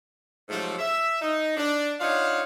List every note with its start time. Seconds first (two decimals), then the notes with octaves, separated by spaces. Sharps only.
0.49 G#2 C3 F3 F#3 A3
0.79 E5
1.21 D#4
1.57 D4
2.00 D4 D#4 F4 C#5 F5 F#5